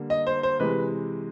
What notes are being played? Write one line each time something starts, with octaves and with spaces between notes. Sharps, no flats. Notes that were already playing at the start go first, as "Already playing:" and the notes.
Already playing: D3 G3 A#3
D#5
C5
C5
C3 E3 G#3 B4